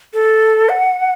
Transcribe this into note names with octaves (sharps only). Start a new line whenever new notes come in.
A4
F#5